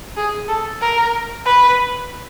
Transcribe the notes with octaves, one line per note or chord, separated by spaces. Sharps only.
G#4
A4
A#4
B4